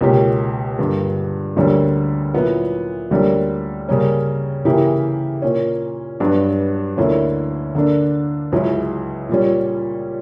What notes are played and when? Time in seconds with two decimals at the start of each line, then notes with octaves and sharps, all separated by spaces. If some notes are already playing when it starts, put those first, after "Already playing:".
0.01 C#2 B2 A#3 C#4 G4
0.79 G2 D3 A#3
1.56 D2 D3 G3 A#3 C#4
2.34 A#2 F#3 B3 E4
3.11 D2 D3 G3 A#3 C#4
3.89 C#3 G3 A#3 C#4
4.65 C#3 E3 A#3 E4 G4
5.42 A#2 A#3 C#4
6.20 G2 F#3 B3 D4 F#4
6.97 D2 D3 A#3 C#4 E4
7.75 D3 A#3 D4
8.52 C#2 C#3 F#3 C#4 E4
9.29 A#2 G3 C#4